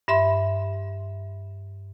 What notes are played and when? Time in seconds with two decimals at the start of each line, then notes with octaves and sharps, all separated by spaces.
0.08 G2 E5 C6